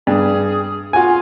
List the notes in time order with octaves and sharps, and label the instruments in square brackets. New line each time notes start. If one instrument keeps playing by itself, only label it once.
[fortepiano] G2 [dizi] G#4
[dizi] F4 [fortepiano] F#4 G#5